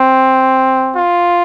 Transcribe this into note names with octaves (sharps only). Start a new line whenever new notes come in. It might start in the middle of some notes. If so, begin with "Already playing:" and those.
Already playing: C4
F4